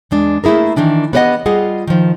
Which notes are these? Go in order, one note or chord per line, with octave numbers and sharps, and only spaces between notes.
E2 G#3 D4
A3 A#3 E4 G#4 A#4
D#3 E3 D4 E4
B3 G4 B4 D5 D#5 F#5
G3 F4 G#4 D#5 F#5
D#3 F3